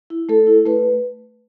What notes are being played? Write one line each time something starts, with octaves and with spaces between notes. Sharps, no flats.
E4
A3 A4
E4
A3 B4